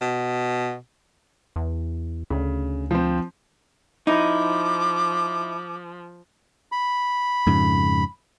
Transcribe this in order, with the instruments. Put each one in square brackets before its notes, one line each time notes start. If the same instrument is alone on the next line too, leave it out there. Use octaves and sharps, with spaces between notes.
[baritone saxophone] B2
[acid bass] E2
[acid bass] D2 [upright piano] C#3
[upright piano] F3 C4
[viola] F3 [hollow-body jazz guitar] D#4 E4 [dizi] D6
[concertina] B5
[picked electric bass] F2 G#2 C#3